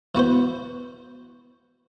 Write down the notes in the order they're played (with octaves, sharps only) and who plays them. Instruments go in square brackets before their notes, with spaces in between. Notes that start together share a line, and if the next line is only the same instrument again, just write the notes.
[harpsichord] E3 B3 F#4 C5